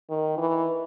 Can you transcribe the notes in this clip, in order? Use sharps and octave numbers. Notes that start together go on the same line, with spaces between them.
D#3
E3